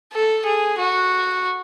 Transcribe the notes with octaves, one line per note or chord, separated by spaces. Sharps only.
A4
G#4
F#4